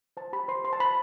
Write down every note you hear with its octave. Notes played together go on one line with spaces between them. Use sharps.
C5 A5
G4 B5
C5 C6
C5 C6
A5
C5 B5